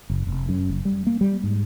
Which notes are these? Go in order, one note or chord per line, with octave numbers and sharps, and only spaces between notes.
F#1
F1
F#2
F#1
G3
A#3
G3
G#2